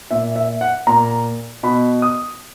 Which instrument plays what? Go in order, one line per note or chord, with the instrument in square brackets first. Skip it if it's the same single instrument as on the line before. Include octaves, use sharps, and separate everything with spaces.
[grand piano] A#2 E5
E5
F#5
A#2 A#5
B2 B5
D#6